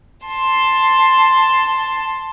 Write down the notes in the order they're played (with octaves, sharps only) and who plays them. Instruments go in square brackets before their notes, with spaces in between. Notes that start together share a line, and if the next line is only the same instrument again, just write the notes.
[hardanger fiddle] A5 C6